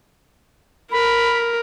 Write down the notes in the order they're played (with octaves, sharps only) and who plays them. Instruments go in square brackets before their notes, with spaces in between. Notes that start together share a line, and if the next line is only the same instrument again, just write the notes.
[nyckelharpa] A#4 [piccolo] B5